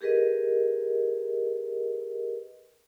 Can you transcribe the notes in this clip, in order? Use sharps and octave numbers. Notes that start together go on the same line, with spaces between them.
G4 G#4 A#4 B4 D#5